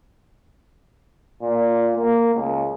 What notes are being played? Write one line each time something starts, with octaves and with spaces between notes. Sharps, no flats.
A#2
A#3
C#2